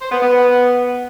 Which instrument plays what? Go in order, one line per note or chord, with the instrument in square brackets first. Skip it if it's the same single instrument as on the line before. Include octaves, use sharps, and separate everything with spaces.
[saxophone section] C5
B3
B3